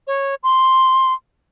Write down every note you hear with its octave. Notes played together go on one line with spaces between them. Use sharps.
C#5
C6